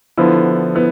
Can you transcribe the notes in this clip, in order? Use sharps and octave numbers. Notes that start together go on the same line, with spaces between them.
D3 F3 B3 E4
B3 E4